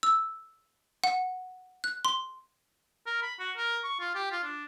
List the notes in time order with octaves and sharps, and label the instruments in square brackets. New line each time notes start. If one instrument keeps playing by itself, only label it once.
[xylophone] E6
F#5
F#6
C6
[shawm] A#4
B5
F#4
A#4
C#6
F4
G4
F4
D4